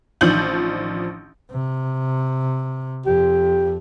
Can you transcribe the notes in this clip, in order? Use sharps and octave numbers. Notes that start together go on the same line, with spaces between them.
A1 D#3 F3 D4 G6 F#7
C3
F2 G4